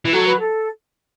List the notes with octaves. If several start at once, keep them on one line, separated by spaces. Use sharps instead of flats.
E3
F#3 A4
B4
A4